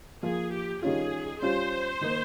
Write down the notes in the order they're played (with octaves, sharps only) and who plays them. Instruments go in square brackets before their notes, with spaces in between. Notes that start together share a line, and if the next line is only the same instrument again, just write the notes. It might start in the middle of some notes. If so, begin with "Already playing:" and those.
[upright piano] F3 A#3 F4 [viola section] G#4
[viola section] G4
[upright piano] D#3 G3 C#4 F4 [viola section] G#4
[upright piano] G3 C#4 F4 [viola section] C5
[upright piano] D#3 A#3 D#4